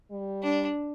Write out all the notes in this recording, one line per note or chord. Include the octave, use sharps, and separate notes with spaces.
G3
D4